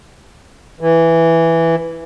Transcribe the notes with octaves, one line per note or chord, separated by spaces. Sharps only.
E3